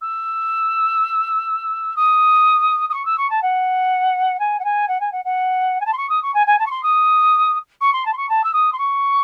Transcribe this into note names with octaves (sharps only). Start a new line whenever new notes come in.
E6
D#6
D#6
C#6
E6
C#6
A5
F#5
G#5
F#5
G#5
F#5
G#5
F#5
F#5
G#5
A5
C6
C#6
D#6
C#6
G#5
G#5
A5
C#6
C6
D#6
C#6
C6
A5
C6
C#6
A5
E6
D#6
C6
C#6